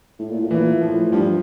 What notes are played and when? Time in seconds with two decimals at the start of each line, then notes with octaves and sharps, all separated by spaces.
0.19 A2
0.30 A#2
0.40 A2
0.50 A#2 E3
0.81 A2 F3
1.12 G2 F3